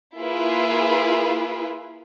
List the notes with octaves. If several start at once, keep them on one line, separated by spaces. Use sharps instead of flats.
A#3 E4 F4 G#4 B4